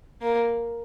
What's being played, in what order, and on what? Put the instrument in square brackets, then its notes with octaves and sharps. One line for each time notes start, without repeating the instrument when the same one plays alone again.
[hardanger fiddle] A#3